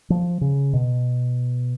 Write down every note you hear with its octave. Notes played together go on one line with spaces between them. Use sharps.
F3
C#3
B2